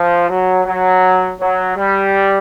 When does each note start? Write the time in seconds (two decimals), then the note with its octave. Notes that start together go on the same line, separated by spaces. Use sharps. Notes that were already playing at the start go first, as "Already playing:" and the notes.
Already playing: F3
0.29 F#3
0.65 F#3
1.40 F#3
1.76 G3